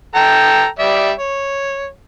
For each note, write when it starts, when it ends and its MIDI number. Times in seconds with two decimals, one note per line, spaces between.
0.15 0.66 69
0.15 0.66 79
0.15 0.66 82
0.79 1.12 55
0.79 1.12 74
0.79 1.12 76
1.19 1.88 73